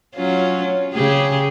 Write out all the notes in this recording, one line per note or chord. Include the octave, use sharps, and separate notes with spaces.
F#3 C#4 F4
C#3 G4 G#4